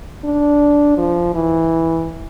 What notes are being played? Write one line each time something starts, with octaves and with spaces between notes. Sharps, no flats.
D4
F3
E3